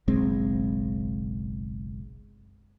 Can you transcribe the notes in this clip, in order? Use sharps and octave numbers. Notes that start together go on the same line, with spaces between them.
F#1 B1 G#3 C4